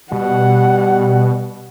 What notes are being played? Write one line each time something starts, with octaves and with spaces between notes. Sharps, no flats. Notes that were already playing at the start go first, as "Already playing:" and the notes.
B2 G3 F#5